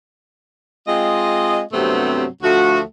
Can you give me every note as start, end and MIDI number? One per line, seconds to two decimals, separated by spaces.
0.87 1.60 56
0.87 1.60 60
0.87 1.60 65
0.87 1.60 75
1.73 2.25 43
1.73 2.25 48
1.73 2.25 54
1.73 2.25 57
1.73 2.25 59
1.73 2.25 60
2.43 2.81 38
2.43 2.81 53
2.43 2.81 57
2.43 2.81 66